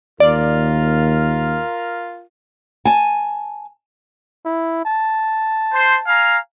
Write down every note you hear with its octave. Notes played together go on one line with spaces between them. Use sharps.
D#2 F4 A#4 D5
G#5 A5
E4
A5
C5
F5 G#5 A#5